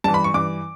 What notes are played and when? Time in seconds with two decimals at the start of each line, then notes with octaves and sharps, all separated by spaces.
0.04 G2 A5
0.08 E3
0.14 B5
0.24 C#6
0.34 G2 E3 D6